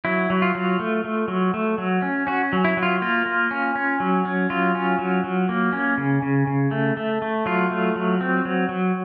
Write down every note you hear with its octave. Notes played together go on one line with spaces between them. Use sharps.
F#3 E4
F#3
F4
F#3
A3
A3
F#3
A3
F#3
C#4
C#4 F#4
F#3
E4
F#3
F4
A#3 F4
A#3
C#4
C#4
F#3
C#4
F#3 F4
C#4
F#3
F#3
A#3
C#4
C#3
C#3
C#3
A3
A3
A3
F#3 F4
A3
F#3
C4
F#3
F#3